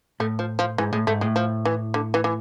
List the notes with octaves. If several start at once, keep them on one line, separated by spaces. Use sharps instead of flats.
A2 A3
F3
F3
G#2 E3
A2 G#3
G#2 A3
A2 G#3
F3
E3
D3
E3
E3